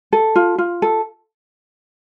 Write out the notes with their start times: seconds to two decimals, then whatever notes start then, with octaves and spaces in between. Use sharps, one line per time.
0.13 A4
0.35 F4
0.58 F4
0.82 A4